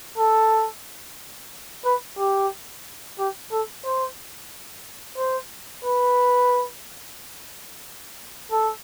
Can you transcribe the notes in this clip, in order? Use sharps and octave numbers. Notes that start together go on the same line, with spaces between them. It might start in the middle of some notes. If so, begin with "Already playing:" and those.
A4
B4
G4
G4
A4
C5
C5
B4
A4